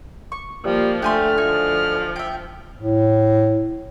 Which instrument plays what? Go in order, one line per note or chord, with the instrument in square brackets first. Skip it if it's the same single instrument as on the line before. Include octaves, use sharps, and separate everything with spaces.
[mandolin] C#6
[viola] F3 A#3 [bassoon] G3
[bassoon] D3 [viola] A3 [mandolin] G4 G#5 C6 [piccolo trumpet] F6
[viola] F3 [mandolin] D#4 F#4 G#5
[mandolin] E5 G5
[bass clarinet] A2